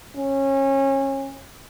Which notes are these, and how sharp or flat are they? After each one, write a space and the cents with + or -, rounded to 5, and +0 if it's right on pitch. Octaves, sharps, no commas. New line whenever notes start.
C#4 -25